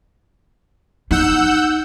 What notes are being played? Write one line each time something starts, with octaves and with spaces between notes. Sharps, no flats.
D#4 F#5 E6 G6